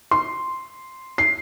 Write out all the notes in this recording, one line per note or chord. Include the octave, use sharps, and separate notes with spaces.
C6
C7